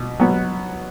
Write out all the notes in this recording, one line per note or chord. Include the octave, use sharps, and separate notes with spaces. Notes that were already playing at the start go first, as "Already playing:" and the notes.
Already playing: B2
F#3 B3